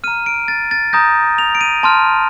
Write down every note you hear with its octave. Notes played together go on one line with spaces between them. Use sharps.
A#5 F6 D#7
D7
A6
A6
A#5 D#6 G6 A#6
F7
D7
D#7
A5 C6 F6